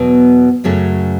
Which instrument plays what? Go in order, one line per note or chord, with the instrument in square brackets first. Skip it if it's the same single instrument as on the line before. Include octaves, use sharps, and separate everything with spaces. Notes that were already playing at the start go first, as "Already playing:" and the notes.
Already playing: [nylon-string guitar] E2 B2 F#3 B3
F#2 C#3 F#3 A3 C#4